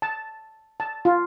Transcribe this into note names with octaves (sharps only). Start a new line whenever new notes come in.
A5
A5
F4